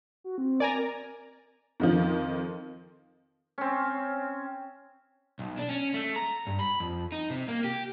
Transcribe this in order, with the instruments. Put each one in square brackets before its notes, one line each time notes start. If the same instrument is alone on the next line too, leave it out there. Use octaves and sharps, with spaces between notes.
[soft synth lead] F#4
C4
[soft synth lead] A#4 [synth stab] D5 G#5 A#5
[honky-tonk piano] F2 D#3 F3
[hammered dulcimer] C4 C#4
[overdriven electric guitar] B1
D4
C#4
A3
A#5
G2
B5
F2
D#4
C3
A#3
G4